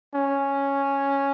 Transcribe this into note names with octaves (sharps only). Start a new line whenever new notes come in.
C#4